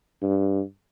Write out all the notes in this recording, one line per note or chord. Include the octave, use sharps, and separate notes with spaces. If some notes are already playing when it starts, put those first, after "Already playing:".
G2